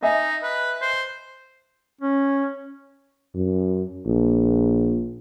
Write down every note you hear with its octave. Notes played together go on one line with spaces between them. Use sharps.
D#4 D#5 E5 G#5
B4
C5
C#4
F#2
A#1